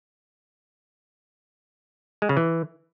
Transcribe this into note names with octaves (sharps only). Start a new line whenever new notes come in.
G#3
C#3
E3